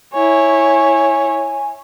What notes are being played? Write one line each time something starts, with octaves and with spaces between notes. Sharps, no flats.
E4 C#5 G#5